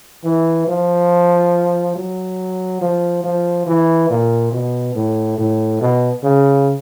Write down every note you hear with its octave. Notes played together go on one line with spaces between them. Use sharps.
E3
F3
F#3
F3
F3
E3
A#2
B2
A2
A2
B2
C#3